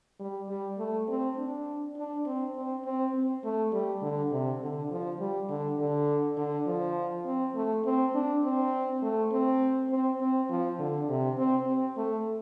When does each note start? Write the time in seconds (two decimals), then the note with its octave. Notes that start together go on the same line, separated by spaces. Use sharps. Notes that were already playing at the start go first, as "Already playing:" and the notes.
0.20 G3
0.49 G3
0.78 A3
1.08 C4
1.37 D4
1.96 D4
2.26 C4
2.55 C4
2.85 C4
3.14 C4
3.44 A3
3.73 G3
4.02 D3
4.32 C3
4.61 D3
4.91 F3
5.20 G3
5.49 D3
5.79 D3
6.37 D3
6.67 F3
7.26 C4
7.55 A3
7.85 C4
8.15 D4
8.44 C4
9.02 A3
9.32 C4
9.91 C4
10.20 C4
10.50 F3
10.79 D3
11.09 C3
11.37 C4
11.67 C4
11.97 A3